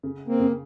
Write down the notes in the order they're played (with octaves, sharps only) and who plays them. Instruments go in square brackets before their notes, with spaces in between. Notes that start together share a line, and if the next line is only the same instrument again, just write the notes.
[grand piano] C#3
[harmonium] A#3 C4
[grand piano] C#3